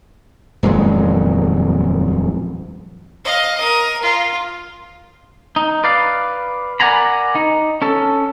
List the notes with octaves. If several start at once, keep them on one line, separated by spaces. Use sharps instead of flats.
D#1 F2 F#3 G#3
D#5 F5
A#4 D#6
F4
D#4
B4 D5 F5
A#4 D5 F#5 G#5 A#5 B5
D#4
C#4 A4